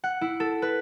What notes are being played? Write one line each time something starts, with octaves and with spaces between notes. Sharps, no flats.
F#5
E4
A4
B4